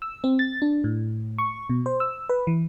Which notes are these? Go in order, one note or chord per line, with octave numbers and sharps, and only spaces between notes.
E6
C4
A6
D4
A2
C#6
B2
C5
E6
B4
E3